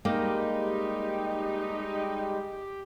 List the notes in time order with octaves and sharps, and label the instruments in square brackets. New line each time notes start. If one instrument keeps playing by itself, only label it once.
[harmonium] G3 G#3 [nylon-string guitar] A#3 [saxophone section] D#4 [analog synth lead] G4